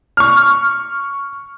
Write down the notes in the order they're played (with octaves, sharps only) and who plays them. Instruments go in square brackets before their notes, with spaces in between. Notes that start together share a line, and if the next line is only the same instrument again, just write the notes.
[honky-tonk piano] C#6 F6